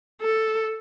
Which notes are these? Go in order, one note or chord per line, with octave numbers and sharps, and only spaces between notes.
A4